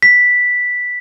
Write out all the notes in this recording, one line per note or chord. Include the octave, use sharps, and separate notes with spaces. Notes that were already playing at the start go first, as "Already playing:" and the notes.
B6